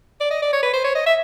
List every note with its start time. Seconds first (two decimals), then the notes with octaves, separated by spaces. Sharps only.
0.21 D5
0.31 D#5
0.42 D5
0.53 C#5
0.63 B4
0.73 C5
0.85 C#5
0.95 D#5
1.06 E5